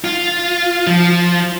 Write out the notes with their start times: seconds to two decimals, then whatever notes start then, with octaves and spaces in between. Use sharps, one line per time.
0.04 F4
0.87 F3